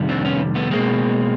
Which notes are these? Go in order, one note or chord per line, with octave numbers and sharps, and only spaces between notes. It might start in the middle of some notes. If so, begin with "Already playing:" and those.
Already playing: F2 C3 D#3 G3
C4 D4
B3 C#4
A3 B3
B2 G#3 A#3 C4